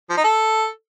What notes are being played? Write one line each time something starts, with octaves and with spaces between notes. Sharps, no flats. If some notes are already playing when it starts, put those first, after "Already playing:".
F3
D#4
A4